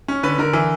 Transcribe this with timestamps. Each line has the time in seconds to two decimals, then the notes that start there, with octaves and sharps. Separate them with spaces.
0.08 C#4
0.23 D3 B4
0.38 D3 A#4
0.53 E3